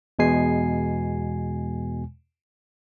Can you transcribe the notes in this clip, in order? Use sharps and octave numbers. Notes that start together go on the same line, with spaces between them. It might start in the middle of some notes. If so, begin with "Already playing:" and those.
E2 B2 G#3 G#5 C7